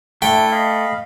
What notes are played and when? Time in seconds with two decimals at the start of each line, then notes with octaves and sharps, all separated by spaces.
0.22 A3 D4 E4 G5
0.52 D#5 F5 B5